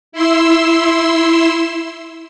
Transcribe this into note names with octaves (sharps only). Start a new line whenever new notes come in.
E4 C6 E6